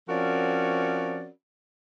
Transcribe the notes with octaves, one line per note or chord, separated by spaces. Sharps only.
F3 C4 C#4 F#4 A#4 D5